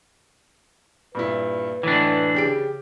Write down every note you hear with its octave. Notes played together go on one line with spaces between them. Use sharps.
G2 A#2 E4 B4
A2 E3 D4
C#3 G4 D7